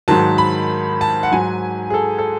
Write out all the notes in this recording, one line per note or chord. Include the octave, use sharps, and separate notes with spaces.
G#2 D#3 F#3 A5
B5
A5
F#5
G#2 F#3 G#5
G#4
A4
A4